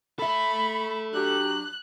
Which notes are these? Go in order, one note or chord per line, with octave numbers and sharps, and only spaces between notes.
A4 E5 B5
F#3 D4 G4 F#6